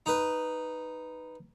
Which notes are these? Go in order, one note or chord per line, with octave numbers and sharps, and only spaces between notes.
D#4 B4